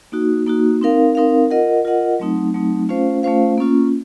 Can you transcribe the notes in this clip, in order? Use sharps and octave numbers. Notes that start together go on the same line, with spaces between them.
A#3 D#4 F#4
A#3 D#4 F#4
C4 D#4 A#4 F5
C4 D#4 A#4 F5
F4 A#4 D#5 F#5
F4 A#4 D#5 F#5
F#3 A3 C4 D#4
F#3 A3 C4 D#4
A3 C#4 F4 C5 F5
A3 C#4 F4 C5 F5
A#3 C#4 F4